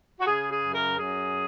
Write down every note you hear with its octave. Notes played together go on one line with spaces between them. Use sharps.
F#4
C#3 G#4
G#4
F#2
A#4
F#2 G#4